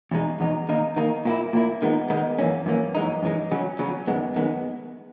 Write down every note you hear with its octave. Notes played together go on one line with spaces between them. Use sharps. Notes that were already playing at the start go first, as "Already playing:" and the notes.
E2 B2 G#3 D#4
E2 B2 G#3 D#4
D#3 A#3 D#4
D#3 A#3 D#4
A#2 A#3 E4
A#2 A#3 E4
D#3 G#3 B3 D#4
D#3 G#3 B3 D#4
F#2 E3 A#3 C#4
F#2 E3 A#3 C#4
F#2 E3 G#3 D#4
F#2 E3 G#3 D#4
C#3 F#3 C#4
C#3 F#3 C#4
F#2 D#3 G#3 B3
F#2 D#3 G#3 B3